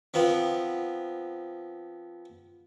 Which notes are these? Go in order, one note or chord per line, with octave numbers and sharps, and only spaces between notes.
F3 B3 C4